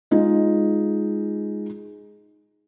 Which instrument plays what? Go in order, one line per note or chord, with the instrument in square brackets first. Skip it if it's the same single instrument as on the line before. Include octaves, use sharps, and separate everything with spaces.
[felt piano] G#3 D#4 F4